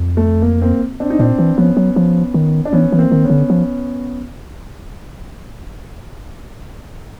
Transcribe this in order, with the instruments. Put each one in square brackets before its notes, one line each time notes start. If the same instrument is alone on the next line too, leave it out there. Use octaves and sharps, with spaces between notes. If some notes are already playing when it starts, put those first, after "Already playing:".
Already playing: [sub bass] F2
[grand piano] A3
A#3
A#3 C4
C4 D4
D#4
[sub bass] A#2 [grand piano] C4 D4
[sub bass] E3
[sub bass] F3 [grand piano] B3 C#4
[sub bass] F#3
F3
D#3
[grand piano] D4
[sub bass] E3 [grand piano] B3 C#4
[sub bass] E3
[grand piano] A#3 C4
[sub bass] D#3
[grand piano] B3 C#4
[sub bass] D3
F3